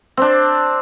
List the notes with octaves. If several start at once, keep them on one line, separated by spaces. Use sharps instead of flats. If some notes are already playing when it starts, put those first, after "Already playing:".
C4 D4